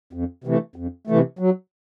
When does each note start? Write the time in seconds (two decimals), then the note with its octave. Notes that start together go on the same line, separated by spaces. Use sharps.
0.13 F2
0.44 C3 E3 A3
0.76 F2
1.07 C3 E3 A3
1.39 F#3